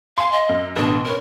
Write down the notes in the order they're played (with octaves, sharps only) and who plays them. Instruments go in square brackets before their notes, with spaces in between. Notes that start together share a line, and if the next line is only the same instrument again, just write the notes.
[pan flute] F5 [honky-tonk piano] G#5 C6
[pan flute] D#5
[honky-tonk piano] F#2
[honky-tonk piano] A1 B2 [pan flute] D4
[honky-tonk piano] C#4 B4 C#5 [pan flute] A#4